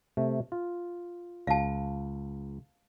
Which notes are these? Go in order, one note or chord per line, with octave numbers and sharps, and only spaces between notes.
C3 A3
F4
C#2 F5 A5